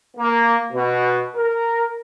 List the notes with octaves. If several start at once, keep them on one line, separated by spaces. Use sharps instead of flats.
A#3
B2
A#4